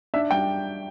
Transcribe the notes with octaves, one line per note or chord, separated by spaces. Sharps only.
D4 E5
G3 G5